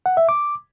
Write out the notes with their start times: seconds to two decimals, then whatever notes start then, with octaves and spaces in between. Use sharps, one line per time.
0.06 F#5
0.17 E5
0.29 D6